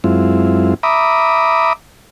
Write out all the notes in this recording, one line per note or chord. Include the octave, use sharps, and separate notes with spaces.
F#2 G#3 C4 E4 F4
E5 A#5 B5 D6 D#6